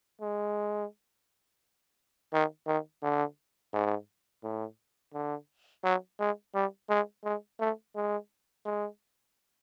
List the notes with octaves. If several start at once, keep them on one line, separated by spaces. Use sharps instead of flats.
G#3
D#3
D#3
D3
G#2
A2
D3
F#3
G#3
G3
G#3
G#3
A3
G#3
G#3